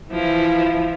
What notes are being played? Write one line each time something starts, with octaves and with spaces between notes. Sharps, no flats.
E3 F3 E4